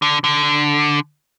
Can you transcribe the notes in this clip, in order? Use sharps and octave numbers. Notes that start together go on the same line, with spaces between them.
D3
D3